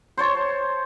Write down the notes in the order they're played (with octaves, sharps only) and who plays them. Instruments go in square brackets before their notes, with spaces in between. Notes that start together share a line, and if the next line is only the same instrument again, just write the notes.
[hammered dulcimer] C5 C#5 A5